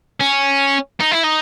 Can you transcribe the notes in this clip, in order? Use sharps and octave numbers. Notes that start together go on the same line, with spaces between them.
C#4
D#4
E4
D#4